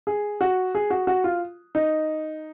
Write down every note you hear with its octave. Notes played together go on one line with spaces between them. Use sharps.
G#4
F#4
G#4
F#4
F#4
F4
D#4